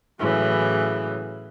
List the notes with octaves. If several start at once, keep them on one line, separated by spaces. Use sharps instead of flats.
A2 C#3 E3 F#3